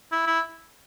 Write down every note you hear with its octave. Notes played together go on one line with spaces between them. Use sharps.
E4
E4